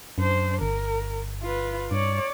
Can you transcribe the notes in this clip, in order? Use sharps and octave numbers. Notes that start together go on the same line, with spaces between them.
F#2 D4 C5
G1 A#4
F4 B4
G2 C#5 D5